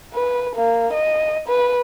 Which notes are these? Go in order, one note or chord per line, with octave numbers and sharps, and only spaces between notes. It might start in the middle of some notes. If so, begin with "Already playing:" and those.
B4
A#3
D#5
B4